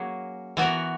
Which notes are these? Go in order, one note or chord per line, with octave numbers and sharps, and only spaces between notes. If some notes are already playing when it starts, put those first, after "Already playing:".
Already playing: F#3 A#3 C#4 G#4
E3 B3 F#4 A#4